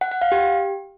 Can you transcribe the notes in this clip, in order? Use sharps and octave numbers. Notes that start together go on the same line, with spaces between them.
F#5
F#5
F5
G4